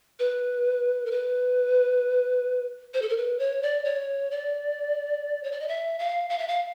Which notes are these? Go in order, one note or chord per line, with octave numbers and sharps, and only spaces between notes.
B4
A#4
B4
C5
A4
A#4
B4
C#5
D5
C#5
D5
C#5
D5
D#5
E5
F5
F5
E5
F5